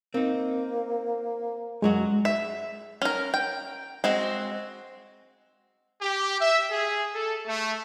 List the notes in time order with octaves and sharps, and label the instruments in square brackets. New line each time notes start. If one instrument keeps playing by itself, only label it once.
[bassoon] A#3 [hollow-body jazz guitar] C4 D#4
[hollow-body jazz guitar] F#2 F#3 F#4 [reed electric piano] G#3
[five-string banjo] E5
C#4 A#4
G5
G#3 C4 F#4
[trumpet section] G4
E5
G#4
A4
A3